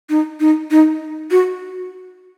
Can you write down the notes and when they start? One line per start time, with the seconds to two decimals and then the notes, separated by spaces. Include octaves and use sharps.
0.10 D#4
0.40 D#4
0.71 D#4
1.31 F#4